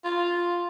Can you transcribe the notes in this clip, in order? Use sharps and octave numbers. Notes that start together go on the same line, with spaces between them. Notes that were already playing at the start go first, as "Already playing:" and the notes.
F4